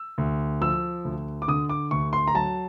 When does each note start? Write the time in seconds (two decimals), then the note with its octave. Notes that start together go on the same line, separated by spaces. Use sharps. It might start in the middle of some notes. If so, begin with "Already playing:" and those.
Already playing: E6
0.18 D2
0.61 F3 E6
1.05 D2
1.42 D6
1.48 D3 D#6
1.69 D6
1.91 D2 C#6
2.13 C6
2.27 A#5
2.35 F#3 A5